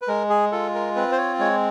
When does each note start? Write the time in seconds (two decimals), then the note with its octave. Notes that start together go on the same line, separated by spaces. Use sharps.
0.02 B4
0.08 G#3 A#4
0.30 G#4
0.52 F4 A4
0.75 A#4
0.96 C4 B4
1.12 C5
1.18 C#5
1.39 G#3 C#5